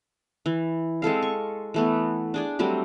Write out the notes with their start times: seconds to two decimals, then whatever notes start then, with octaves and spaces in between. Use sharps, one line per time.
0.46 E3
1.02 G#3 C4 A4 F5
1.22 C#6
1.74 E3 A3 B3
2.34 D4 G#4 D5
2.59 F#3 G3 A3 C4